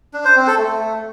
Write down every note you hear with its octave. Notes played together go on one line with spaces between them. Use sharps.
D4
C5
C4
A4
A3